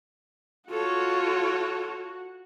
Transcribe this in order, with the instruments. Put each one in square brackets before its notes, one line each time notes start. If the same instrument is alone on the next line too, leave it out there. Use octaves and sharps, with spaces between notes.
[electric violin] F4 C#5 [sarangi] F#4 [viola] A4